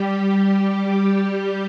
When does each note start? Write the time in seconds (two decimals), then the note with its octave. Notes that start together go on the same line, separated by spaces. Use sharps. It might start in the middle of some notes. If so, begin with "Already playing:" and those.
Already playing: G3 G4